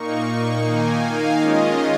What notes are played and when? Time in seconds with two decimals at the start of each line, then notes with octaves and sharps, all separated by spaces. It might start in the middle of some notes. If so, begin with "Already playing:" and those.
Already playing: A#2 A#3 D#4 C#6
0.65 D#3 A#3 D#4 G#5
1.02 F5
1.40 D#3 G#3 C#4 F4 D#5